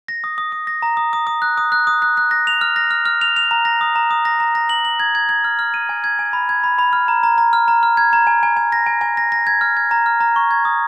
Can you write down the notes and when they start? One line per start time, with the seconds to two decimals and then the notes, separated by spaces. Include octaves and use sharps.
0.08 A#6
0.24 D#6
0.38 D#6
0.52 D#6
0.67 A#6
0.82 A#5
0.97 D#6
1.13 D#6
1.27 D#6
1.42 F#6
1.57 D#6
1.72 F#6
1.87 D#6
2.02 F#6
2.17 F#6
2.31 A#6
2.47 F7
2.61 F6
2.76 A#6
2.91 F6
3.06 F6
3.21 F7
3.36 F7
3.51 A#5
3.65 A#6
3.81 D#6
3.96 A#5
4.11 D#6
4.25 A#6
4.40 A#5
4.55 A#6
4.69 F#7
4.85 F#7
5.00 G#6
5.15 G#6
5.29 G#6
5.44 F6
5.59 F6
5.74 D#7
5.89 G#5
6.04 G#6
6.19 G#5
6.33 B5
6.49 G#6
6.64 B5
6.79 B5
6.93 F6
7.08 A#5
7.23 A#5
7.38 A#5
7.53 F6
7.68 A#5
7.83 F6
7.97 G#6
8.13 A#5
8.27 G#5
8.43 G#5
8.57 G#5
8.72 A#6
8.86 G#5
9.01 G#5
9.17 A#6
9.32 A#6
9.47 G#6
9.61 F6
9.77 G#6
9.91 A#5
10.06 F6
10.20 A#5
10.36 C#6
10.51 G#6
10.65 D#6